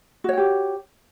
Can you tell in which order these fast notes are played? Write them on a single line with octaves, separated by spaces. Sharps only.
F#4 C#5 G5 G4